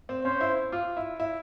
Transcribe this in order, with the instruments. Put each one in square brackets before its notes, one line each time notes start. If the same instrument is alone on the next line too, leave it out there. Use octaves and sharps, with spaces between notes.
[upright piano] C4
[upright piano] C#4 [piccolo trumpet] C5
[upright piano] E4
F4
E4
E4